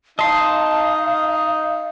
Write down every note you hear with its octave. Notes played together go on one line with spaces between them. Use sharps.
D#4 D#5 F5 A5 C6